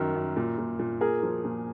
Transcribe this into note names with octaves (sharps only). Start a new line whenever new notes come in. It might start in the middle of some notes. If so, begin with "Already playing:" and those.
Already playing: F#2 D#3 A#4
F#2
A#2
A#2
A#2
A#2 G#4 A#4
F3
A#2